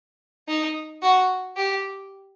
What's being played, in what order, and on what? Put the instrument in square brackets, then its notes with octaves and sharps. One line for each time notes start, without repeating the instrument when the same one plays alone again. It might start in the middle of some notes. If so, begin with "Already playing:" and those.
[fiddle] D#4
F#4
G4